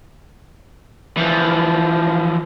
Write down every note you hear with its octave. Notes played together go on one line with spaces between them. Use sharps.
E3 F3